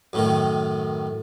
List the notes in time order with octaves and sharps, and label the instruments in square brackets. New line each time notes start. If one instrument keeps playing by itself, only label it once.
[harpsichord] F#2 A2 D#3